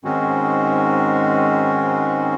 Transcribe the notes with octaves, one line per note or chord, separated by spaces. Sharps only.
G#2 D#3 G#3 C4 C#4 F#4